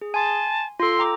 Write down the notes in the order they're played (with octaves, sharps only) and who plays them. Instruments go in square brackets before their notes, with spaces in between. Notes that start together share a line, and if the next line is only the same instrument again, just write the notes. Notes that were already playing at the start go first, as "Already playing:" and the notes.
[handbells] G#4
[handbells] G#5 C6 [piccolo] A5
[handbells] F4 A4 [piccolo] C6
[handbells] G5 A#5 D6